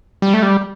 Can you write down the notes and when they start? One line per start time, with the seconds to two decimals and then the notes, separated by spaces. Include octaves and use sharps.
0.22 G3
0.34 A3
0.42 G3